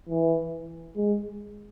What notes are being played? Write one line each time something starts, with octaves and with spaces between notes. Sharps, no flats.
E3
G#3